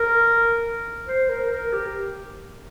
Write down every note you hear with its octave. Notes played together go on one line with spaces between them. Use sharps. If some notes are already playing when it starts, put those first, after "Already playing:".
Already playing: A#4
C5
A#4
A#4
G4